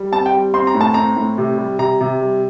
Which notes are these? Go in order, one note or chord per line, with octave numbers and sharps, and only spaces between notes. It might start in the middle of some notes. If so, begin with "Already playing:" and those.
Already playing: G3
C4 A5
G5
G3
C4 C6
A#5
A2
A5
C4 A#5
A2
C3
G3
C3 A#5
C3
G3